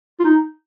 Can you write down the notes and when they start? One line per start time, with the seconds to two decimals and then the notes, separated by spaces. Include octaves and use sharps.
0.20 F4
0.24 D#4